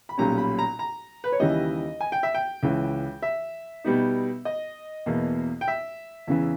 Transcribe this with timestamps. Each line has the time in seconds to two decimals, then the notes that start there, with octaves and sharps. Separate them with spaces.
0.09 B5
0.18 B1 A#2 G3 C#4 A#5
0.38 B5
0.59 A#5
0.79 A#5
1.24 B4
1.32 C#5
1.40 D#2 C#3 E3 G3 D#5
2.01 G#5
2.12 G5
2.23 E5
2.34 G5
2.63 C#2 C#3 E3
3.22 E5
3.84 B2 G3 B3 D#4
4.45 D#5
5.06 E2 B2 A#3
5.61 G5
5.68 E5
6.27 E2 C#3 E3